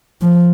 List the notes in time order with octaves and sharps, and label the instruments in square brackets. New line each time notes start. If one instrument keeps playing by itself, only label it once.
[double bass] F3